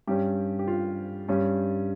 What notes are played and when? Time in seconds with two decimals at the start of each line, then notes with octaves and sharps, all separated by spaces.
0.08 G2 G3 C#4 G4
0.59 G4
0.68 F4
1.29 G2 G3 C#4